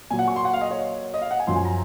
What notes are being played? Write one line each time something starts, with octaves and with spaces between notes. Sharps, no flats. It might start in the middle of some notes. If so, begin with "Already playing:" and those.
A#2 F#3 G#5
F#5
C#6
C6
F#5
F5
D#5
C#5
D#5
F5
F#5
G#5
F#2 F3 C6
G#5
A#5